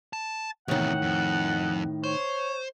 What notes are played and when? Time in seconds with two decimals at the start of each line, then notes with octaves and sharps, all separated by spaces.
0.13 A5
0.68 E2 A2 C3 D#3 F#5
1.02 F2
2.04 C5 C#5